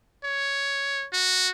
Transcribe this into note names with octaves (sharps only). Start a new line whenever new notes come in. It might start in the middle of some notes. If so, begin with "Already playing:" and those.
C#5
F#4